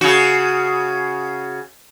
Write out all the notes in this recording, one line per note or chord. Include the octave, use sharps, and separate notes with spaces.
C#3 F#4